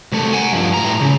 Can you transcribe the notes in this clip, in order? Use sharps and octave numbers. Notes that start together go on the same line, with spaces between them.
C2 A3
F#5 G#5
G2 F3
A2 A#5
C#3